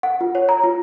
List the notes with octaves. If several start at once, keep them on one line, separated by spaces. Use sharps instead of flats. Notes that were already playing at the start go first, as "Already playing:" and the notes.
F#5
F4
C#5
A#5
F4